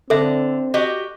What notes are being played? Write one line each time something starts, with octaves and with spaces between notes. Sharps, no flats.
D3 C4 A4 E5
F#4 G4 D#5